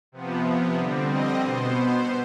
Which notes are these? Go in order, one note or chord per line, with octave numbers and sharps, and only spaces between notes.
C3 F3 B3
D3 G3 C4
D#5
B2 B3 C5